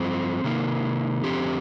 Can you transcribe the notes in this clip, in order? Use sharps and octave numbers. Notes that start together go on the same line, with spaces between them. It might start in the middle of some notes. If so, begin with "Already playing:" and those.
Already playing: G2 F3 C4
C3 D#3 A#3
F2 D3 F3 C4 G4